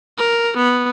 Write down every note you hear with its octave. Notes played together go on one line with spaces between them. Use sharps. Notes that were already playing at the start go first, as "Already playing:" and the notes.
A#4
B3